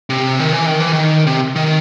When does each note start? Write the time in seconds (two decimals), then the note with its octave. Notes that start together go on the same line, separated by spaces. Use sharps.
0.10 C3
0.39 D#3
0.52 E3
0.66 D#3
0.80 E3
0.93 D#3
1.27 C3
1.56 D#3